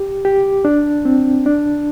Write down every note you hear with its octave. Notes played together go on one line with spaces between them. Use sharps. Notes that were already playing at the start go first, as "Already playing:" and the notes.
Already playing: G4
G4
D4
C4
D4